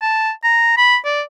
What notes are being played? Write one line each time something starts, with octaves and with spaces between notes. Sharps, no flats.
A5
A#5
B5
D5